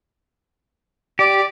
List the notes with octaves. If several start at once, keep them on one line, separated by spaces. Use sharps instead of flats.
G4 D5